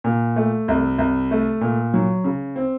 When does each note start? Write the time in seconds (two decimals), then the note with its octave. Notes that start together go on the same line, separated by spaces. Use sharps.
0.04 A#2
0.36 A3
0.68 C2
0.98 C2
1.31 A3
1.61 A#2
1.94 F#3
2.24 C#3
2.56 C4